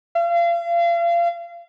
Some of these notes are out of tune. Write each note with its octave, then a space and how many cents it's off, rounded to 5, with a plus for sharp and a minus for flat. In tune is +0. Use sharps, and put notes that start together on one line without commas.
F5 -35